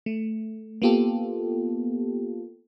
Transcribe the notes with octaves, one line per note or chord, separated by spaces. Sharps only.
A3
A#3 B3 F4 G4 A4